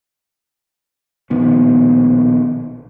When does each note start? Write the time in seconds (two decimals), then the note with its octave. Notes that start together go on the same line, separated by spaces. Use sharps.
1.30 A#1 B2 D#3 B3